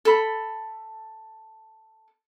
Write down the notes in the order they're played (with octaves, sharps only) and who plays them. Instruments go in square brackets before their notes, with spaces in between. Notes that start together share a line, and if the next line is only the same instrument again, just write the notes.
[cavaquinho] A4 B5